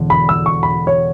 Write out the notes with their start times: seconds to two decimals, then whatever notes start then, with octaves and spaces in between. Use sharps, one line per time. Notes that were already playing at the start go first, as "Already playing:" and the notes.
Already playing: E1 D3
0.10 B5
0.29 E6
0.46 C#6
0.63 B5
0.87 C#5